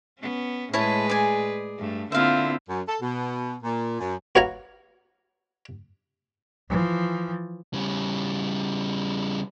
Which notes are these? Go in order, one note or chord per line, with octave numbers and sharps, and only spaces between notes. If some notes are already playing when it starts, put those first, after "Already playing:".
B3 C#4
A2 G#3 E4 G#4 B4 C#5 A5
D5 G#5
G2 A3
D3 A#3 C4 E4 F4 E5 F5
F#2
A4
B2
A#2
F#2
F#4 B4 C#5 F5 F#5 A#5
E3 F3
C#3 G3